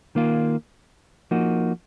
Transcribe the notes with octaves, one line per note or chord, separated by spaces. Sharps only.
D#3 A#3 F4
F3 A#3 D#4 F#4